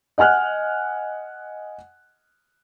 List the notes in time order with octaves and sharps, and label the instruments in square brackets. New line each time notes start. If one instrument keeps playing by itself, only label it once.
[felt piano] D#5 F#5 G#5 F6 F#6